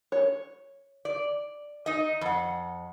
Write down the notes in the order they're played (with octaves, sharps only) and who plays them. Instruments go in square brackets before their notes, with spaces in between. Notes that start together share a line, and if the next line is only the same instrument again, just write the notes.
[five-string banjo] C#5
[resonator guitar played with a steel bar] D5
D#4 D#5
F2 F#5